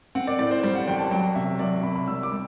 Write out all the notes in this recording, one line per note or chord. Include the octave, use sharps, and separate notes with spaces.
C4 F#5
D5
A2 D5
C5
G3 C5
F#5
A1 G5
A5
F#3 G5
C3 E5
F#3 D5
C3 B5
B5
G3 E6
D6
G3